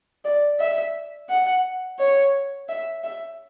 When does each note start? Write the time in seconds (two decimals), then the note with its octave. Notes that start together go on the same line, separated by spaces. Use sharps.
0.24 D5
0.60 E5
1.29 F#5
1.99 C#5
2.69 E5
3.04 E5